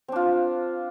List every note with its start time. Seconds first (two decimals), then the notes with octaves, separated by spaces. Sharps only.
0.08 C4
0.12 D4
0.16 F4